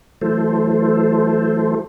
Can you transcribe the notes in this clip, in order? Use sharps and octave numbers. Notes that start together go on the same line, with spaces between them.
E3 F#3 A3 A4 C5